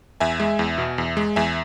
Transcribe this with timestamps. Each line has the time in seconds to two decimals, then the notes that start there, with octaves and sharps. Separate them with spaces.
0.20 E2 E5 G#5
0.40 G#3
0.59 E2
0.78 B2
0.98 E2
1.17 G#3
1.36 E2 E5 G#5